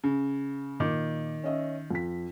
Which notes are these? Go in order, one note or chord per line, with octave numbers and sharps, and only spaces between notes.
C#3
A#2 D#3 A#3 D6
C#4 D#5 E5
F2 B6